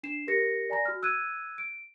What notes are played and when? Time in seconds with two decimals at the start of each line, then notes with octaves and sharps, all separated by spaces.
0.03 D4 C7 E7
0.27 G4 A#4 A#6 C#7
0.70 D5 G#5 A#5 A#6
0.85 F#4 F6
1.02 E6 F#6 G#6 D#7
1.58 D7